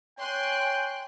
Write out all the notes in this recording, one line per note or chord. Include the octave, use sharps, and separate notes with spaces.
C#5 G5 G#5 C6 F#6